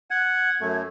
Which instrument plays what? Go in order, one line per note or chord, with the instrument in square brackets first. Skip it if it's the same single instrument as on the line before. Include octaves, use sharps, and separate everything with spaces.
[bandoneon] F#5 [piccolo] G#6
[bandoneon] F#2 A3